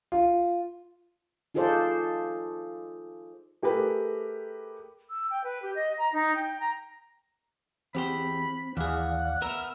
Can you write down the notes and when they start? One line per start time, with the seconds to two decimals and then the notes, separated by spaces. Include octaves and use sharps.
0.12 F4
1.54 D#4 F4 G#4 A4 C5 D5
3.63 A3 G4 G#4 A#4 B4
5.10 E6
5.31 G5
5.44 B4
5.62 G4
5.75 D#5
5.98 A#5
6.13 D#4
6.35 G5
6.60 A#5
7.95 E2 C4 G4 C5 B5
8.77 D#2 E3 G#4 D5 F5 F#5
9.42 B3 A#4 E5 E6 F6